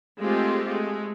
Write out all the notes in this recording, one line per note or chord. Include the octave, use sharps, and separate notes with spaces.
G#3 A3 C4 F4 G4
G#3 A3